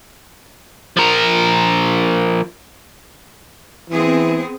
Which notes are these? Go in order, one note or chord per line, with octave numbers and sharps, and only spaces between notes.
F3 A#4
E3 B3 C4 G#4